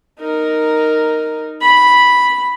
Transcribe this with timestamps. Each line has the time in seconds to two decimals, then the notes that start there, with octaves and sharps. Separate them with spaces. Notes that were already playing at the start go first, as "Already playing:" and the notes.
0.20 D#4 A#4
1.61 B5